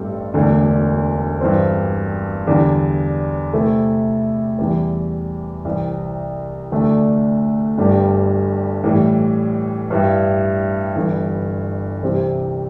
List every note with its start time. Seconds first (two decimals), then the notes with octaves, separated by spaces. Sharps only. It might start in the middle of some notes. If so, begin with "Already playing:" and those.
Already playing: A1 G2 G3 C4 A4
0.34 E1 D2 D3
1.41 G2 E3 C4
2.47 E2 D3 G3 D4
3.53 C3 A3 E4 A4
4.59 E2 E3 G3
5.65 C2 C3 E3
6.72 D2 D3 A3 D4
7.78 G1 G2 G3 D4 G4
8.84 A2 E3 G3
9.90 G2 G3 E4
10.96 G1 G2 E3
12.03 C2 C3 E3 C4 G4